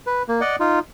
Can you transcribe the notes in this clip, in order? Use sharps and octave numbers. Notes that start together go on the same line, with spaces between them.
B4
A#3
D5 D#5 F#5
D#4 F4